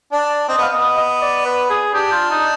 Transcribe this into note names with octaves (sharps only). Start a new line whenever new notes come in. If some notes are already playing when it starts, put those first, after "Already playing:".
D4 D5
C4 D#5
B3
F5
B3 D#5
D#5
D5
B4
G#4
D4 G4
F4
D#4